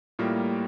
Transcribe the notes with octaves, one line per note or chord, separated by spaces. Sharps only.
A2 G3 A#3 F4 A#4